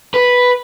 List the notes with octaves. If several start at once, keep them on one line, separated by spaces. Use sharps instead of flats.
B4